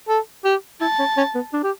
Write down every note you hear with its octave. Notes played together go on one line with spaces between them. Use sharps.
A4
G4
E4 A5
C#4
C#4
B3
D4
G4